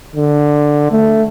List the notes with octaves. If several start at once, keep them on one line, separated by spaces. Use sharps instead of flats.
D3
A3